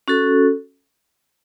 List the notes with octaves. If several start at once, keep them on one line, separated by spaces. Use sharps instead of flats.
C#4 F#4 A4